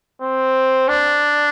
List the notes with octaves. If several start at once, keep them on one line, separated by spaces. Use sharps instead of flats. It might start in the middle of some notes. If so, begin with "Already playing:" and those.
C4
D4